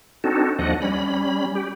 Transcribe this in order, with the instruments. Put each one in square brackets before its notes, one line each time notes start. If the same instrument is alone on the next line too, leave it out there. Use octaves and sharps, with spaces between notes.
[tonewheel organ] C4 D4 D#4 F#4 A4
D#2 F3 D4 D#5 F#5
G3 C#4 B5
G4